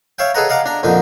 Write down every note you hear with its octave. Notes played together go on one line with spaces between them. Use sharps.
C#5 E5 F5 G5
G#4 A4 B4 D#5 F#5 A#5
D#5 F5 F#5 A#5 D6
D4 A#5
F2 A#2 D3 D#4 D#5